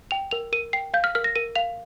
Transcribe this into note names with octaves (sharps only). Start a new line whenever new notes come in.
G5 F7
A#4 F7
A#4 D#7
G5 C7
F5 G6
F6
A#4 F6
A#6
A#4 D#7
F5 F7